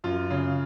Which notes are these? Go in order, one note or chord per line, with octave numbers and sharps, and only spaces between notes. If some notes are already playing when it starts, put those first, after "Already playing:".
F#2 F4
C#3